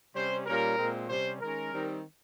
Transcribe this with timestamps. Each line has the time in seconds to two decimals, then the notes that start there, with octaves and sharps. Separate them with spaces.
0.15 C3 G3 C#4 C5
0.46 A#2 G3 C#4 A#4
0.78 A#2 G#3 C4
1.09 C3 G3 C#4 C5
1.41 D#3 G#3 C#4 A#4
1.72 D#3 G3 C4 D#4